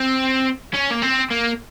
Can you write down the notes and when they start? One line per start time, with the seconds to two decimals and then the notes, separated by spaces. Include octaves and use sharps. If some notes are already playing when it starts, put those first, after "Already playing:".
Already playing: C4
0.74 C#4
0.91 A#3
1.02 C4
1.31 A#3